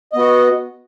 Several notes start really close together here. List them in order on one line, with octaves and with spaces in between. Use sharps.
D#5 B3 F#4